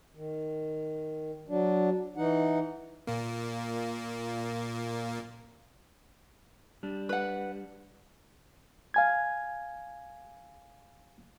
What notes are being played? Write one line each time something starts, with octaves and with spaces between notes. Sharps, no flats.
D#3
F#3 D4
E3 D#4 F#5
A#2 A#3
G3 D4
B4 F#5
F5 G#5 G#6